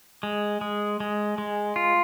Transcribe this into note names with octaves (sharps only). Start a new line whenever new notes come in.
G#3
G#3
G#3
G#3
F4